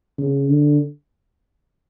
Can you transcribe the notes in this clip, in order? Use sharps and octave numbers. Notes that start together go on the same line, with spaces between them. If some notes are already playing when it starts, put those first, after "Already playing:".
C#3
D3